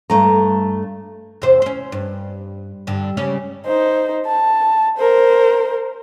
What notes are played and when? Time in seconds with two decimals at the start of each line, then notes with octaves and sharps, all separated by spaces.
0.10 G2 A3 A#5
1.42 E2 C3 C5
1.62 C#4 C5
1.92 G2
2.87 G2 D3
3.17 C#3 G3 C#4
3.66 D#4 C5
4.26 A5
4.98 A#4 C5